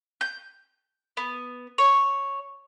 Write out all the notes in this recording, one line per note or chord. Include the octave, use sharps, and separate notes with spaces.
G6
B3
C#5